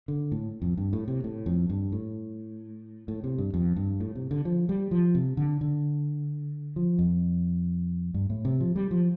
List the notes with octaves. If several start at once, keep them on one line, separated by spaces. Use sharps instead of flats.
D3
A2
F2
G2
A2
C3
A2
F2
G2
A2
A2
C3
G2
F2
G2
A2
C3
D3
F3
G3
F3
C3
D3
D3
F3
F2
G2
A2
C3
F3
G3
F3